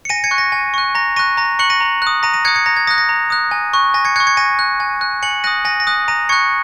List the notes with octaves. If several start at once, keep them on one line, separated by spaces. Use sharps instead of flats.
C#7
G#5 A#6 D#7
G#6 C#7
C#6 F#6
A#6
G#5
C#6 F#6
A#5 A#6
C#6 F#6 A#6 D#7
A#5 A#6
C#6 F#6 C#7 F#7
A#6 D#7
A#5
D#6 F#6
A#5 A#6 D#7
A#6 D#7
D#6 F#6 G#6 C#7
G#6 C#7
A#5 A#6
G#6
D#6 F#6 A#6
A#6
A#5
D#6 F#6
G#5
C#6 F#6
G#5 A#6
G#6 C#7
C#6 F#6 G#6 C#7
G#6 C#7
G#5 A#6 D#7
F#6
G#5
F#6
G#5 C#7 F#7
D#6 F#6 A#6 D#7
G#5 A#6
A#6
D#6 F#6
A#5 A#6 D#7
C#6 F#6 G#6 C#7